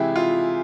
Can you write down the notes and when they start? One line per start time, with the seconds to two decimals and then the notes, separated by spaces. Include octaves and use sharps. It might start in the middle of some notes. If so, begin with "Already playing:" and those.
Already playing: C3 E3 G#3 E4 G4 G#4
0.16 F4